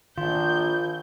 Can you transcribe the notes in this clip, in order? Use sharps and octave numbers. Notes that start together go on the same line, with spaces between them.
A#1 D#3 F4 G6